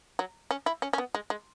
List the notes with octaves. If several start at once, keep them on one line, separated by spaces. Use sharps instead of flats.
F#3
C#4
E4
C#4
C#4
B3
G#3
G#3